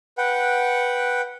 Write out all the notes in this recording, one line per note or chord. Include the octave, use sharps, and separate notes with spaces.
B4 F#5 G5